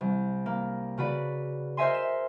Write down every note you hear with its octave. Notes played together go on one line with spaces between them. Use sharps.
C2
A#3
C#3 F#4 B4 D5
A#4 C5 D#5 E5 G#5 C6
E7